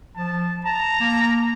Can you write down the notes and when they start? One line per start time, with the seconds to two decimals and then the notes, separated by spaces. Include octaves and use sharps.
0.16 F3 A5
0.65 A5 A#5
1.00 A#3